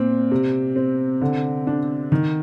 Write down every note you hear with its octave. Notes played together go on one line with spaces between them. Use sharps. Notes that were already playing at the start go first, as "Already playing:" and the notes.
Already playing: A#2 C4
C3
C4
D3
D4
D#3